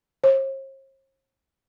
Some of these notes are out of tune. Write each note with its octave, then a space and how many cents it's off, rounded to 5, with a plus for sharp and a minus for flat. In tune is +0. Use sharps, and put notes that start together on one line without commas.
C5 +45